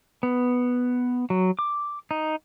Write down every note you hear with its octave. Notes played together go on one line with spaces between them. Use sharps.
B3
F#3
D6
D#4